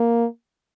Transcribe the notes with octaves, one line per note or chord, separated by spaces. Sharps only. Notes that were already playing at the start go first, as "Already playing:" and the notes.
Already playing: A#3